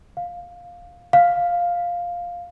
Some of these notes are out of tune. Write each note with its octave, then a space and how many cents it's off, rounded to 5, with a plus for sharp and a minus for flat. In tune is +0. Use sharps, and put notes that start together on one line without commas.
F5 +10
F5 +5